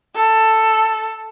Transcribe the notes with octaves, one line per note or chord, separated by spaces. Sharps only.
A4